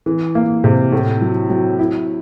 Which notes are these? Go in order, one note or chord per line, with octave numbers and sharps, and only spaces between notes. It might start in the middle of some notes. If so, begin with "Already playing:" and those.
E3
A#3
C3
A2
F#3
F#3
E4